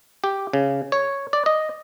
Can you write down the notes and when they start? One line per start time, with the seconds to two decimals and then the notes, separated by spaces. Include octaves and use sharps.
0.24 G4
0.53 C#3
0.92 C#5
1.33 D5
1.46 D#5